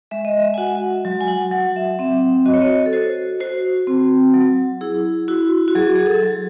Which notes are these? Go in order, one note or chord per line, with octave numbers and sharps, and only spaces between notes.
G#3 E5
D#5
E5
G#5
F#4 F#5
F#3
G#5
F#5
F#3 F#5
E5
C4 E5
F#4 D#5
C#5
D#5
A4
F#4 C5
F#4 C5
C4
F#3
E4 G#4
E4 F#4
F#4
F#3 G#4
G#4
A4
F#3